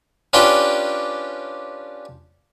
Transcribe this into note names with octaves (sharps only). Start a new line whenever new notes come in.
C#4 D4 F4 G4 B4 G5